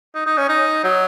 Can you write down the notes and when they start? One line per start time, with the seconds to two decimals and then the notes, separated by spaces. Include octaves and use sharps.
0.15 D#4
0.26 D#4
0.38 C#4
0.49 D#4
0.84 F#3